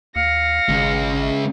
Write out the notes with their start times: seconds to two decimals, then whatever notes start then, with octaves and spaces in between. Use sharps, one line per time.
0.16 D#2 F5 A#6 C#7
0.69 G#1 C#2 G#3
1.21 E5